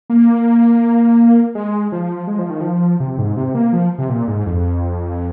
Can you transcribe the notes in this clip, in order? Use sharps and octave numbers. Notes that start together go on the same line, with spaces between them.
A#3
G#3
F3
G#3
F3
D#3
F3
C3
G#2
C3
A#3
F3
C3
A#2
G#2
F2